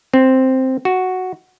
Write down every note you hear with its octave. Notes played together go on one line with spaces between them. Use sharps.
C4
F#4